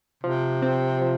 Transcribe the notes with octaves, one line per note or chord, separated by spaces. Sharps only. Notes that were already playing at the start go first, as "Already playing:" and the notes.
C3 F3
C4
F3